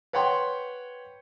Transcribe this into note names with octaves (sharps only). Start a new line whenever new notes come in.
B4 C#5 F#5 G5 C6